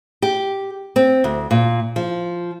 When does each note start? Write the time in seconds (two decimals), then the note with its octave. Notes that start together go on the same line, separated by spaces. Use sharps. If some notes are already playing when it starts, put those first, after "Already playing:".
0.22 G4
0.96 C4
1.24 D2
1.51 A#2
1.96 F3